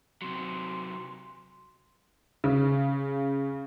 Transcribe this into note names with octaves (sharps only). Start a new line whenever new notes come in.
C3 F#3 C6
C#3